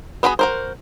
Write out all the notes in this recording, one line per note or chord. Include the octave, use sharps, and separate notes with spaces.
B3 D4 F#4 G#4 B5
F#4 A#4 C5